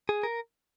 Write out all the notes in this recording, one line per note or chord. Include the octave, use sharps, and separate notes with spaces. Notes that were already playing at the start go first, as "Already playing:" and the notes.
G#4
A#4